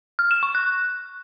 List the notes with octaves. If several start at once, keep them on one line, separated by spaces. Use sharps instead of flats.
F6
E7
C#6
F#6